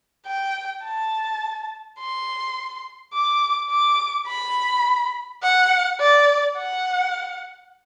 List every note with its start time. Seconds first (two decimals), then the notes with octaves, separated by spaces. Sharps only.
0.27 G5
0.84 A5
1.99 C6
3.13 D6
3.71 D6
4.27 B5
5.43 F#5
6.00 D5
6.57 F#5